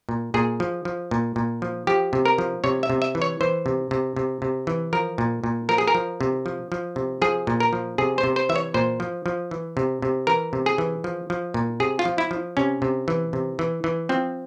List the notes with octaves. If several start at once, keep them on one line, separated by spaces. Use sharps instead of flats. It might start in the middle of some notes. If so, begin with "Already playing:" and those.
A#2
A#2 G#4
F3
F3
A#2
A#2
F3
F3 G4
C3
A#4
F3
C3 C#5
E5
C3
E5
E3
C#5
E3 C5
C3
C3
C3
C3
E3
F3 A#4
A#2
A#2
F3 A#4
G#4
A#4
F3
C3
F3
F3
C3
F3 G#4
A#2
A#4
F3
C3 G#4
C5
C3
C5
E3 E5
C#5
A#2 C5
F3
F3
E3
C3
C3
E3 A#4
C3
G#4
E3
F3
F3
A#2
C3 G#4
F4
F3
E4
F3
C3 C#4
C3
E3
C3
E3
E3
F3 C4